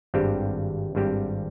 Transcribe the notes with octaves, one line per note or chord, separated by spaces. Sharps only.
G#1 G2 G3 C4 G4
G#1 G2 G3 C4 G4